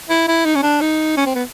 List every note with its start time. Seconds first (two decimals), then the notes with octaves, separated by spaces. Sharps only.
0.09 E4
0.28 E4
0.46 D#4
0.56 C#4
0.63 D4
0.82 D#4
1.17 C#4
1.26 C4
1.35 B3